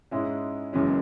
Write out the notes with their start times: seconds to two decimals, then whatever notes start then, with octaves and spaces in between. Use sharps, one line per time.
0.11 G#2 G#3 C#4 E4
0.73 F#1 F#2 E3 G#3 C#4